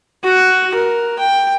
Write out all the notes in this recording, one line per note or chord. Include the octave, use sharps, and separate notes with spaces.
F#4
A#4
G5